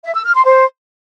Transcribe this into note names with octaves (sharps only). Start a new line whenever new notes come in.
E5
E6
F6
C6
C5